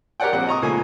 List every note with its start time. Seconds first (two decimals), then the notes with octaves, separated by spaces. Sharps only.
0.20 G4 A#4 C#5 D5 F#5 G5
0.33 A#1 C4 F#5
0.47 D#5 A#5 C#6 D#6
0.62 C#2 A#2 A3 G#5